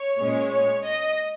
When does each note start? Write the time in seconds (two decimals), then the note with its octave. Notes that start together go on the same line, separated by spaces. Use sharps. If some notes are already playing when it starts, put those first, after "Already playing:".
Already playing: C#5
0.19 A#2 G#3 C#4
0.51 C#5
0.84 D#5